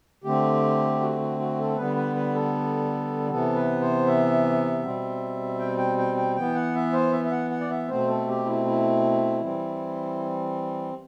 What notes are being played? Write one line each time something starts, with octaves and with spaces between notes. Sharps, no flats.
D3 A3 C4 G4
F#4
F#4
F#4
A4
D3 G3 B3 B4
B4
B4
A4
C3 E3 B3 A4
B4
C5
E5
B2 G3 C4
G5
G5
G5
G5
E3 B3 G5
F#5
E5
C5
E5
E5
F#5
F#5
D5
E5
B2 A3 C4 C5
A4
G4
E4
E4
E3 G3 C4